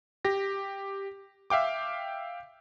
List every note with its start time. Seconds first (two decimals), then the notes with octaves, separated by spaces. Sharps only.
0.25 G4 A#6
1.50 E5 F5 G5 D6